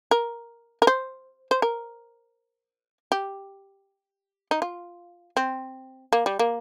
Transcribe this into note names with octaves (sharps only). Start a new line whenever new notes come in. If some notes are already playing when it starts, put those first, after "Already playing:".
A#4
A#4
C5
C5
A#4
G4
D#4
F4
C4
A#3
G3
A#3